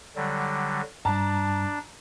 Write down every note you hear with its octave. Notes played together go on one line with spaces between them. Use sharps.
D3 F#3 G3
G2 G3 D4 A5 A#5